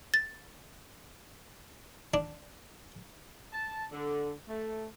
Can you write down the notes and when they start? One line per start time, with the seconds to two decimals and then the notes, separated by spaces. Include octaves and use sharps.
0.14 A6
2.14 D4
3.53 A5
3.91 D3
4.48 A3